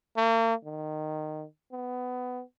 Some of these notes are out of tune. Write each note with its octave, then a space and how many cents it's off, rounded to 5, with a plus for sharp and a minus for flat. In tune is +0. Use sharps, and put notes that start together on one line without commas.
A#3 -40
D#3 -15
B3 +20